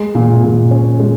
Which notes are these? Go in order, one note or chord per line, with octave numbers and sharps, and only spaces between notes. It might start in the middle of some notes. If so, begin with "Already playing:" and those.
Already playing: G#3
A#2
A#2
C#4
G#3